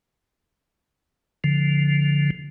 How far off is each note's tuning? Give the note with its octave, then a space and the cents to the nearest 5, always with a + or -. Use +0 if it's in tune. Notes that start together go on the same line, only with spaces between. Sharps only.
D3 -20 F3 +0